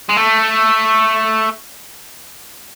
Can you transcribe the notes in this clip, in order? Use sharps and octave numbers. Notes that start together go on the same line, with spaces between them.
G#3
A3